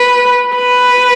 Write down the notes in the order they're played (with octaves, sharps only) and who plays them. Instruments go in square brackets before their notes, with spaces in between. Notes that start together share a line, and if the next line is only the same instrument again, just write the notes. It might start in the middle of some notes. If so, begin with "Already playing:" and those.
Already playing: [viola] B4
B4